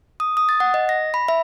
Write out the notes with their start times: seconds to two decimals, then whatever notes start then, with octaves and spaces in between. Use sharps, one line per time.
0.20 D#6
0.37 D#6
0.49 A6
0.60 F#5
0.74 D#5
0.89 A#6
1.14 B5
1.28 E5